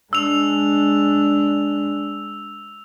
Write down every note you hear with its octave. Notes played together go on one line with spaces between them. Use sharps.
G#3 D4 E6 F7